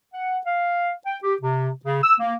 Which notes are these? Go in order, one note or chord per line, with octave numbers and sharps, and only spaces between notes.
F#5
F5
G5
G4
C3
C#3
E6
A#3